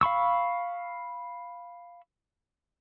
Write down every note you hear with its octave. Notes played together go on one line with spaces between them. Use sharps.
F5 B5 C#6 E6